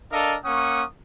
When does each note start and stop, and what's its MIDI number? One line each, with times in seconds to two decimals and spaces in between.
0.12 0.36 62
0.12 0.36 69
0.12 0.36 70
0.12 0.36 75
0.12 0.36 77
0.45 0.83 58
0.45 0.83 61
0.45 0.83 78
0.45 0.83 85
0.45 0.83 87